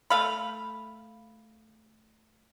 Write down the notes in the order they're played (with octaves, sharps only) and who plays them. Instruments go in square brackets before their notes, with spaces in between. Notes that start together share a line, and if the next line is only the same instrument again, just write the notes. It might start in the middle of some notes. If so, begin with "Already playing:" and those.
[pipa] A3 F5 B5